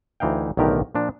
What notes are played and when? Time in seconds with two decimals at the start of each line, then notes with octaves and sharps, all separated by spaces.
0.20 D2 E3 D#4 F5 G5
0.57 B1 A2 D3 D#3 G4 A#4
0.95 A#2 F3 D4